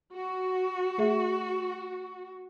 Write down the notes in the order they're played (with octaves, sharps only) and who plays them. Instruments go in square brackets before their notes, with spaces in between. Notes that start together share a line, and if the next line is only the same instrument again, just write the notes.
[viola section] F#4
[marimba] A3 G#4 E5